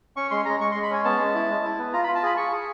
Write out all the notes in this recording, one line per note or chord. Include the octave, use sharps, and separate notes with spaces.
C#4 C#6
G#3 C6
G#3 A#5
G#3 C#6
C6
G#3
B5
C#4 G#5
B3 A5
G#3
E4
G#3
E4
B3
F4 A#5
B5
F4
A5
G#4 B5
G#4 C#6
G#4